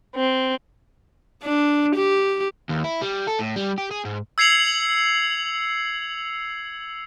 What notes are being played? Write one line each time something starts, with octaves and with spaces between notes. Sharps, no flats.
C4
D4
G4
D#2
E4
G3
A4
A2
G3
G4
G#4
G#2
E6 G#6 C7 C#7 F7 F#7